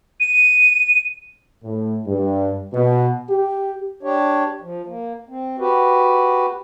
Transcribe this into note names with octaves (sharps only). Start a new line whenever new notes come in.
D#7
A2
G2
B2
G4
D4 G4 C#5
F3
A#3
C4
F#4 G4 B4